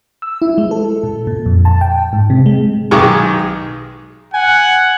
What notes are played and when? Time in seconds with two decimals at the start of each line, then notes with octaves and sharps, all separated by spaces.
0.22 E6
0.42 E4
0.58 G#3
0.71 A4
1.04 A#2
1.27 A#2
1.46 F2
1.65 A5
1.81 G5
2.13 G#2
2.30 C3
2.46 G#3
2.91 B1 D#3 G#3 G#4 C#6 D6
4.34 F#5 G#5